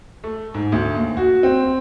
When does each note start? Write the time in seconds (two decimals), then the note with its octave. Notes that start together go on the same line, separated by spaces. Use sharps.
0.24 A3
0.54 G#2
0.72 D2
0.95 D#2
1.17 F#4
1.43 C4